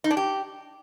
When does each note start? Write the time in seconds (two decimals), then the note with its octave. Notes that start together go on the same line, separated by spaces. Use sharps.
0.04 D#4
0.11 D4
0.17 G4